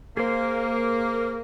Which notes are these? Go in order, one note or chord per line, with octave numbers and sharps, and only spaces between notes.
A#3 G#4 C5